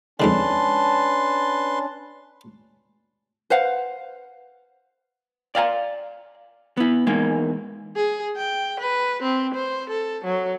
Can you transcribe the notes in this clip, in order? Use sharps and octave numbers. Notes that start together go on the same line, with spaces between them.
F2 G#2 D3 C#4 D4 B4 A5 C6
B4 C5 F5 F#5
D5 F5 G5 A#5
B3 E4
E2 G#3 A#3 D#4
G#4
G5
B4
C4
C5
A4
F#3